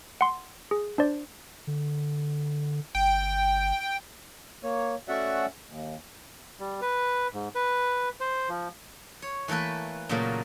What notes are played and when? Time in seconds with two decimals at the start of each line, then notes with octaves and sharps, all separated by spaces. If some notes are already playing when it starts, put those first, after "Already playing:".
0.21 F#5 C6
0.71 G#4
0.98 D4 C5 D5
1.67 D3
2.95 G1 G5
4.63 A#3 C#5
5.08 A3 C#4 F#4 D5 E5 F#5
5.69 D#2
6.60 G3
6.81 B4
7.34 G#2
7.55 B4
8.21 C5
8.49 F3
9.22 C#5
9.48 E3 A3 A#3 A4 B4
10.09 A#2 C#3 F#3 A3 A#3